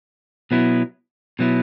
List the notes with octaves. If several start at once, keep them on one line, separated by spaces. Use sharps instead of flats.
B2 F#3 B3 E4
B2 F#3 B3 E4